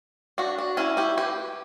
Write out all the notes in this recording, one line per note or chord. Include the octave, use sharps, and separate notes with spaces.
D4 F#4
D4
C#4 E4
E4 G4
G4 B4